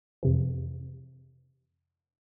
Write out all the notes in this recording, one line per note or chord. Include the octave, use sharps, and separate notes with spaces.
F2 C3 E3